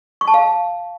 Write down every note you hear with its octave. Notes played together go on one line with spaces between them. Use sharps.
C#6
A5
F5